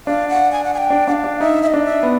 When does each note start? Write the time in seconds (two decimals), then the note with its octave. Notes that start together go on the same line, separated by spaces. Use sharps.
0.06 D4 F5
0.29 F#5
0.52 G#5
0.64 F#5
0.74 G#5
0.78 G5
0.90 D4
1.08 D4 F#5
1.12 F5
1.24 D4
1.40 D#4 E5
1.62 E5
1.67 D#5
1.73 D4
1.85 E5
2.03 B3